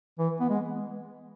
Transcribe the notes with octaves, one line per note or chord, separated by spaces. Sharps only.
E3
B3
G#3